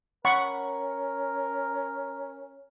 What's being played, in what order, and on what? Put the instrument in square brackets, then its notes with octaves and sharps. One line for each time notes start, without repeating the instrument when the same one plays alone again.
[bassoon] C#4 [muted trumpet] A#4 [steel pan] F#5 B5 C#6